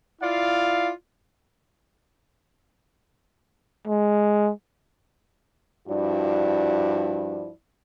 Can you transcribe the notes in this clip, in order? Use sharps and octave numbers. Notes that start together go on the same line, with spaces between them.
E4 F4 D5 F5
G#3
G2 F3 E4 F#4 D5